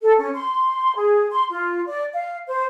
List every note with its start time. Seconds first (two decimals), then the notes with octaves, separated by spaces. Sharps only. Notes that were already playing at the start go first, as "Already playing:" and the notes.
0.01 A4
0.19 C#4
0.34 C6
0.95 G#4
1.31 C6
1.50 F4
1.87 D5
2.13 F5
2.48 C5